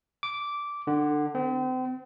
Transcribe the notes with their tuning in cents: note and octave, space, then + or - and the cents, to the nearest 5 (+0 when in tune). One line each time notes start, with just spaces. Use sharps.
D6 -10
D3 +20
C4 -35